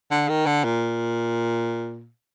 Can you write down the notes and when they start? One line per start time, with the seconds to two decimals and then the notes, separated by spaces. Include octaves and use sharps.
0.11 D3
0.29 D#3
0.47 D3
0.64 A#2